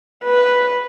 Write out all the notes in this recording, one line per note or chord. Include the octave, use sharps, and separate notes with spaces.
B4